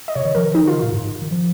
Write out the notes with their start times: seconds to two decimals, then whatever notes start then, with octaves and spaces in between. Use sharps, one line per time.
0.08 D#5
0.15 C3 C#5
0.25 D#3
0.35 F3 A#4
0.45 D#3
0.54 F3 D#4
0.64 D#3
0.67 F4
0.73 C#3
0.79 A#2 F4
0.93 G#2
1.22 D#3
1.31 F3